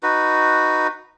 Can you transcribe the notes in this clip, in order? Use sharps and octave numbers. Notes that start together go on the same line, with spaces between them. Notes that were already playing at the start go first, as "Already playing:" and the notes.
D#4 F#4 B4